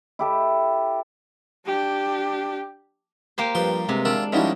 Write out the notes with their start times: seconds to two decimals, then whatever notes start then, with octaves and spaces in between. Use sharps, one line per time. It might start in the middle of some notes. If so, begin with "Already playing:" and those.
0.19 E4 G4 A4
1.66 D4 G4
3.38 A#3 G4 C5
3.55 G2 F3 B4 C6
3.89 C3 G#3
4.05 D#3 D4 E4 F4
4.33 F3 G3 C#4 D#4 E4 F#4